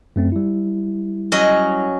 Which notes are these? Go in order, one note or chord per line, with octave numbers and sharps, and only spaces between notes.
F#2 A3 C4
G3 E4
F#3 C#4 D#5